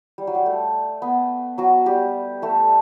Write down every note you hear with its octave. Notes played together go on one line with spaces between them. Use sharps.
G3
F#3
G3
A3
B3
F#3 F#4
G3 G4
A3 A4